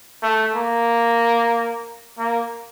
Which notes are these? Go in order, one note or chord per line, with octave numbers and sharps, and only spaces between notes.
A3
A#3
A#3